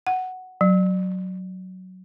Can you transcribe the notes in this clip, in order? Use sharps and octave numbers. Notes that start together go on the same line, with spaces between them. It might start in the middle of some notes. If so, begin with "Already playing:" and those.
F#5
F#3